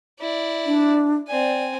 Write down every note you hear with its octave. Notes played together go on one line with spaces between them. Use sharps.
E4 D5
D4
C4 D5 G#5